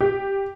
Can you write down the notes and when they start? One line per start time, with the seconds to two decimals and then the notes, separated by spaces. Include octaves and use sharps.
0.01 G4